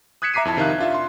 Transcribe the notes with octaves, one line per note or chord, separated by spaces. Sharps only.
D#6 F#6 G#6 B6 C#7 E7
E5 A#5 D6 B6 C7 D#7
F2 E4 A5
C3 D#3 D#4 E5 F5 F#6
D4 F4 E5
C6